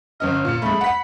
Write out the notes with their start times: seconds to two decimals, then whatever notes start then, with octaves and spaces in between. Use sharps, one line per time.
0.20 G1 C#4 D#5 F6
0.45 A#2 C#7
0.62 G#3 A3 B5
0.81 F#5 B6